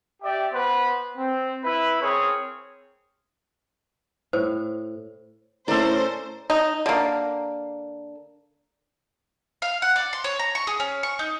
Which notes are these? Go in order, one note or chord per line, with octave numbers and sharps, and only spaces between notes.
G4 D5 E5 G5
B3 B4 C5
C4
E4 B4
C4 G#4 A#4 C#5
A2 C5
A2 C#4 A4 A#4 C5 D5
D#4
D3 A#3
F5
F#5
D5
C6
C#5
A#5
C#6
G#4
C#4
C#6
D#4